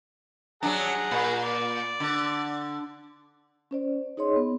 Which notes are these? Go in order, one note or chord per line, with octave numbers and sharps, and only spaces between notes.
F#3 D4 G#4 F#5 A#5
A#2
D5
D3
C#4 C5 D5
D#4 G#4 C#5 D#5 C6
B3